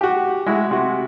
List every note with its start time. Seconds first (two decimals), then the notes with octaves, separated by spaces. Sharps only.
0.01 F#4 G4
0.46 G#3 E4 F#4
0.71 C3 F#4